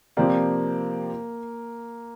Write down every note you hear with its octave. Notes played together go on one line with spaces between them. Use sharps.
C3 F3 A#3 C4 G4 D5